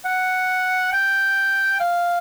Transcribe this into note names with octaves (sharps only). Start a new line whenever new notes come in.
F#5
G5
F5